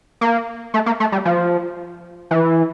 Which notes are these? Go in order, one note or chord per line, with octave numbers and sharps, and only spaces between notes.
A#3
A3
A#3
A3
G3
F3
E3